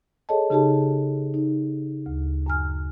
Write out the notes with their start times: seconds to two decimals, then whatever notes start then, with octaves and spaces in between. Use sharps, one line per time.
0.29 G#4 A4 C#5 D#5 A5
0.50 C#3 D#4 G4 G#4 A5
1.34 D#4
2.06 D2
2.46 F#2 G#5 F6